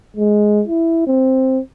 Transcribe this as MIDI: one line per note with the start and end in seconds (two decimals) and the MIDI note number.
0.17 0.63 56
0.68 1.03 64
1.07 1.60 60